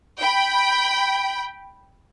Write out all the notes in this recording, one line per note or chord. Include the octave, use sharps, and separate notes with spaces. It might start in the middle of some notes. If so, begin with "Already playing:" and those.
G5 B5